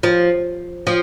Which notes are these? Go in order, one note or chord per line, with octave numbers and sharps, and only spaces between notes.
F3
F3